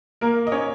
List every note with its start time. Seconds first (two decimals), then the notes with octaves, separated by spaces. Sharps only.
0.21 A#3 A#4
0.47 D#5
0.52 C#4 C#5